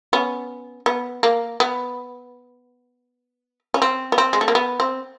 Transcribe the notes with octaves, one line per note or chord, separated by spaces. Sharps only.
B3 C#4
B3
A#3
B3
C#4
C4
B3
C4
G#3
A3
A#3
B3
C4